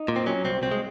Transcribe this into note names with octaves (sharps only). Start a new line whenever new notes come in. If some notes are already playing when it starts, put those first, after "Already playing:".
Already playing: D#4
A#2
C4
F#3 C#4
C2 C4
C2 C4
G#3